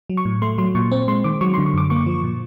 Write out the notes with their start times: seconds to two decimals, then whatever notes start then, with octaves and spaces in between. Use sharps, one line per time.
0.10 F#3
0.17 C#6
0.25 A2
0.42 A3 C6
0.58 F#3 C6
0.75 A#2 C#6
0.92 C4
1.08 G#3 C6
1.24 D#3 D6
1.41 F#3 C#6
1.54 C6
1.58 D3
1.66 C#6
1.74 F#2 D6
1.90 A#3 C#6
2.06 F3
2.24 A#2